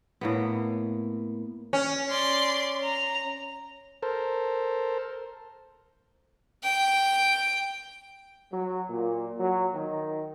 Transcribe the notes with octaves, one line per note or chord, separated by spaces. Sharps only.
A2 A#3 B3
C#4
D5 C6
A#5
A4 A#4 C5
G5
F#3
A#2
F#3
D#3